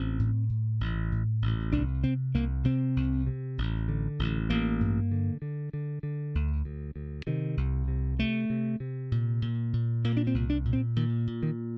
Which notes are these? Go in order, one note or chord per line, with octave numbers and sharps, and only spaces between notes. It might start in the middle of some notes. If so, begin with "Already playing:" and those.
Already playing: A1 C4
A2
A2
A1
A2
A1
C2 D4
C3 C4
C2 A#3
C3 C4
C2
C3
A1
D3
A1
A1 A#3
G2
D3
D3
D3
D3
D2
D2
D2
C3 D#3
C2
C3
C3 A3
C3
C3
A#2
A#2
A#2
A#2 A#3
D4
C4
C2
D4
A#2
C4
A#2 D#3
A#2
D#3